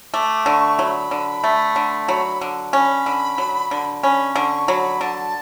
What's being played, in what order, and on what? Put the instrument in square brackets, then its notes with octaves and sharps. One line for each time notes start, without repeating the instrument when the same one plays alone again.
[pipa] A3 [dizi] D6
[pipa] D3 [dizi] D6
[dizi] C#6
[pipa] F#3 [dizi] B5 C#6
[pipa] D3
A3
D3
[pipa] F#3 [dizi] B5
[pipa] D3
[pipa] C#4 [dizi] C#6
[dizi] B5
[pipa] D3
F#3
D3
[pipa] C#4 [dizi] B5
[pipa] D3 [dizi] C#6
[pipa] F#3 [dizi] B5
[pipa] D3 [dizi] A5